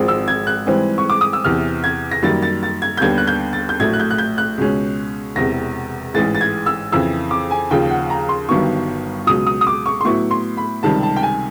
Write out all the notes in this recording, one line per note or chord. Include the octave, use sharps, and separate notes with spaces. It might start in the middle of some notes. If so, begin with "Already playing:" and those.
Already playing: G#1 G#2 F3 G#3 C4
E6
G#6
F#6
G#2 E3 G3 C4
C#6
D6
D#6
E6
E2 C3 E3 F6
G#6
A#6
F#2 D#3 G3 A#3 A6
A6
A6
G#6
G6
D#2 D3 G3 B3 G#6
F#6
G6
A6
G6
A#1 A2 F#3 A3 G#6
F#6
G6
F#6
G6
F#6
C#2 B2 G#3 C#4
E1 E2 C3 A#6
A1 G#2 E3 G#3 A6
A6
G#6
E6
F2 C#3 E3 E6
D6
G#5
D#2 C#3 F3 G5
F#5
A#5
C6
G1 G2 D#3 F#3 B3 C#6
C#2 B2 F#3 D#6
D#6
D#6
D6
C#6
C6
A2 F#3 B3 E4 C#6
C6
B5
C#2 C3 D#3 G3 A5
A5
G5
G#5